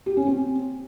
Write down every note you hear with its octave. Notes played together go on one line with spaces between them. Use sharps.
G4
C#4
C4